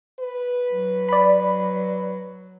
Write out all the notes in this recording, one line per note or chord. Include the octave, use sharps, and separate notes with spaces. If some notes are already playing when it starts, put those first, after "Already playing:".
B4
F#3
D5 B5